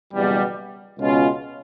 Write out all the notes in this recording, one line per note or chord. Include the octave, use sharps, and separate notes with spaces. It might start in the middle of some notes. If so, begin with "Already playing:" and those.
F#1 E2 B2 G3
C#2 B2 G#3 C#4 F4